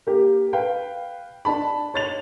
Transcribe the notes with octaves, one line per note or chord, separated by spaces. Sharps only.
A#3 G4
B4 F5 G5
D4 A5 B5
C#5 A6 F7